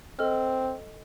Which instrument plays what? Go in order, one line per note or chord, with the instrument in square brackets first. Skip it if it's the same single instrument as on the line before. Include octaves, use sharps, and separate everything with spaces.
[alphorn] C4 [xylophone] A4 D#5 F6